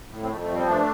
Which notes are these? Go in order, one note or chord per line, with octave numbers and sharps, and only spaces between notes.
A2
C4
F2 A3
A3
F3
G3 C4
G2 A3 D4